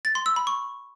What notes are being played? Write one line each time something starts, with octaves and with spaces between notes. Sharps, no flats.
A6
C6
E6
B5
C#6